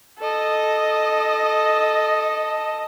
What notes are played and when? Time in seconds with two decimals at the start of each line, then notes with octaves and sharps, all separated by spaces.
0.19 A4 D#5